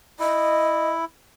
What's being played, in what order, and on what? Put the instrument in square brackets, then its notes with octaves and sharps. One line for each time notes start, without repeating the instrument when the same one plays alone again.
[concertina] E4 [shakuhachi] D#5